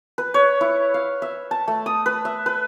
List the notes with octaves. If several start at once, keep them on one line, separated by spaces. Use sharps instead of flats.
B4
C#5
E4
F5
E5
A5
A3
D#6
B4
E5
B4